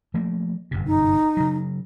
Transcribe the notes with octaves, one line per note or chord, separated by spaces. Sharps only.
F3 A3 A#3
G1 F#2 C3
D#4
C#3 F#3